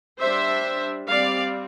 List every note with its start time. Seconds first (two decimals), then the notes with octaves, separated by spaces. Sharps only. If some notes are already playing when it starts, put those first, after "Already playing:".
0.21 G3 D4 C5 E5
1.09 G3 C4 D5 F5